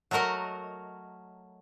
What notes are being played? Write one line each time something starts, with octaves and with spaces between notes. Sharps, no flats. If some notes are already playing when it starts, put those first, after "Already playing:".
F#3 A3 F#4 A#4 D#5